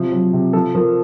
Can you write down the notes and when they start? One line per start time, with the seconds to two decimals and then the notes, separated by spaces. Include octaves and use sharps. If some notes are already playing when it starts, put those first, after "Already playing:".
Already playing: C3 F3
0.12 F#3
0.33 C3
0.53 F3 A4
0.75 F3 A#4